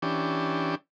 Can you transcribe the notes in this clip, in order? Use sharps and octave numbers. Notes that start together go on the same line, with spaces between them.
E3 C#4 D4 G4